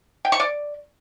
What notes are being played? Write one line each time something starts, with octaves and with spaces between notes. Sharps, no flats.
G5
C#6
D5